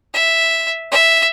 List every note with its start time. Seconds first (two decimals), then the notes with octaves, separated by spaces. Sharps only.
0.14 E5
0.92 E5